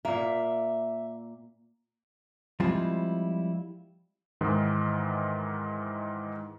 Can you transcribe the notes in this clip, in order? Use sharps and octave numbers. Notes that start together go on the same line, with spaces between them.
A#2 A#3 E5
F3 G3 G#3 C4 E4 F4
G#2 D#3 E3 G#3